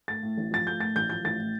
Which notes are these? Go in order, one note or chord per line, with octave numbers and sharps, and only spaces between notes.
A3 A6
A2
A1
F3 A6
A3 G6
A2 A6
A1 G6
F3 G6
A1 A6
A2